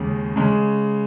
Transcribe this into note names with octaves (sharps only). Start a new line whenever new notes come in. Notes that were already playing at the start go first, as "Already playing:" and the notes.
Already playing: D#2 C#3 G#3
C#3 G#3